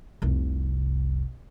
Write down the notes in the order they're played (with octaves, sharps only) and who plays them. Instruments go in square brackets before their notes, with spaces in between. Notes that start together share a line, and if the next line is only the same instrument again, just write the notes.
[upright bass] F1 C2